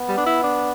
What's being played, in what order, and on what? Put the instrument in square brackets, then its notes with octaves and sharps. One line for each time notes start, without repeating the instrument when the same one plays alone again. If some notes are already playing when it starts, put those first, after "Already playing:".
Already playing: [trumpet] B3
[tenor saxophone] G3
D4
E4
D4